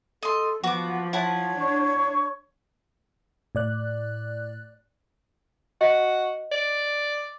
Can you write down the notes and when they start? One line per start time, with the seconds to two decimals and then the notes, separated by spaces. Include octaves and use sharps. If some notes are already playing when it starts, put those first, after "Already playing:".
0.23 A4 D#5 C6
0.64 F3 B3 F#4 D6
1.13 E4 C#5 F#5 A5
1.61 D4 C#6
3.55 A2 D5 F#6
5.81 F#4 D#5
6.52 D5